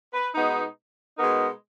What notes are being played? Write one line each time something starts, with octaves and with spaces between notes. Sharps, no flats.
B4
B2 G#3 B3 D#4
B2 G#3 B3 D#4 A#4